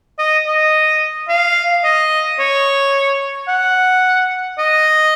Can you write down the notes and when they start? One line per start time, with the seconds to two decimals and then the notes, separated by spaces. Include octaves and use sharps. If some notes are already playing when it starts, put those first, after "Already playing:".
0.19 D#5
0.47 D#5
1.29 F5
1.84 D#5
2.39 C#5
3.48 F#5
4.58 D#5